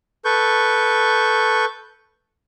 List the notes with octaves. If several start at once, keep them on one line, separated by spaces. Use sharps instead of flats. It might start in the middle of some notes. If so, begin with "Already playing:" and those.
A4 B4 C#6 G6